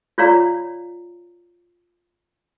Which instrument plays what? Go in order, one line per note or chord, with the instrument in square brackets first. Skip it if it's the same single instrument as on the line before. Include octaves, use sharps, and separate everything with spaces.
[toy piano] F4 C#5 D5 F5 A#5